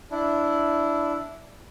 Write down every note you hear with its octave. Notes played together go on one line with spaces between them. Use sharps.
D4 E4